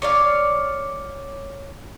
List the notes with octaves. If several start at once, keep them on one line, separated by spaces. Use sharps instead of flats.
C#5 D5 F5